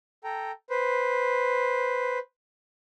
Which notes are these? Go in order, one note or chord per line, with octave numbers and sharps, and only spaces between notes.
A4 G5 A#5
B4 C5